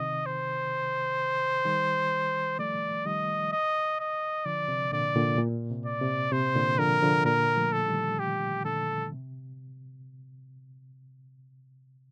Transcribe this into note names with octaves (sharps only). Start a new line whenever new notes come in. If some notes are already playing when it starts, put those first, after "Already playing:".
Already playing: C3 D#3 D#5
C5
D#3 G3
F3 A3 D5
D#3 G3 D#5
D#5
D#5
D3 F3 D5
C3
A#2 D3 D5
A#2 D3
A#2
C3
D5
C3
C3 C5
A#2 D3
D3 F3 A#4
D3 F3
A#2 D3 A#4
F3 A3
A4
D#3 G3
G4
A#2 D3 A4
C3